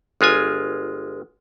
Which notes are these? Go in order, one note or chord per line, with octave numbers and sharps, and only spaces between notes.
G1 G#3 F4 G#5